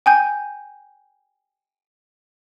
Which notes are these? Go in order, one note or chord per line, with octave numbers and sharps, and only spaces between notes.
G5 G#5 G6